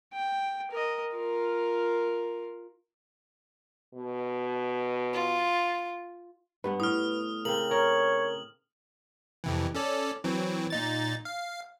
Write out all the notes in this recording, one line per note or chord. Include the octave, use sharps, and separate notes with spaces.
G5
A#4 D#5
F4 A#4
B2
F4
G2 B3 B4 F#5
A2 D#6 F6
C#3 C4 A#4 F#7
A#4 C#5
F2 C3 E3
C#4 A4 D5
E3 F#3 C4
A#2 D#4 A6
F5